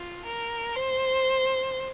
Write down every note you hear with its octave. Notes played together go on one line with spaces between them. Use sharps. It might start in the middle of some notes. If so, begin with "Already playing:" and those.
Already playing: F4
A#4
C5